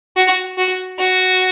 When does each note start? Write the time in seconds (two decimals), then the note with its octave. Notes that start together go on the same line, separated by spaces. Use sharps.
0.16 F#4
0.58 F#4
0.99 F#4